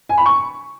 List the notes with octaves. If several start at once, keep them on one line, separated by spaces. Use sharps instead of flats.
G#5
B5
C#6